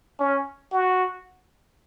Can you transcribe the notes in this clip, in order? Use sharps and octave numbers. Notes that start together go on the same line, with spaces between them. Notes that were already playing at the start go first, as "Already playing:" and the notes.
C#4
F#4